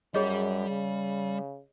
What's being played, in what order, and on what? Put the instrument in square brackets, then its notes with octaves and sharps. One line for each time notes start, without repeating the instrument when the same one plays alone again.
[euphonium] F#2 [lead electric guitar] G3 [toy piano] G#4 C#5 D#5
[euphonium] C#3